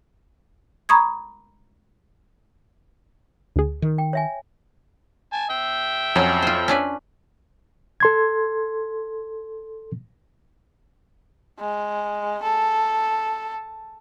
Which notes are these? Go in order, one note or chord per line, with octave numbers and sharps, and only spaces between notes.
A#5 B5 C#6 D#6 G#6
D2 G#4
D#3
G5
C#5 E5 G#5
G#5 A5
E5 G5
F2 F#3 C#4
F4 C5
C#4 D4 B4
A4 C6 G#6
G#3
A4